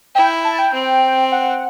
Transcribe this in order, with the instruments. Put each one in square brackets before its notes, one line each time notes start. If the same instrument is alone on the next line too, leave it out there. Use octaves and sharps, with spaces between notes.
[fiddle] E4 [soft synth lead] G5
[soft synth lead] A5
G5
[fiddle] C4
[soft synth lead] F#5